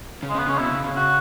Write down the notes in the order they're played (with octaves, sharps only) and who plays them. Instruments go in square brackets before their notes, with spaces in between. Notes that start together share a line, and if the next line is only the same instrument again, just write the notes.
[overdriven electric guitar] C#3
[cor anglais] G#3
[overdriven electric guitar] C#3
[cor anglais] B3
[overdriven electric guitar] C#3 [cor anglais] C#4
[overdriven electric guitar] B2 [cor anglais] E4
[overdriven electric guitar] C#3
C#3
[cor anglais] F#4